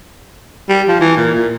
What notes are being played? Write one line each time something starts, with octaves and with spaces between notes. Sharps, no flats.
G3
F3
E3
A#2
A#2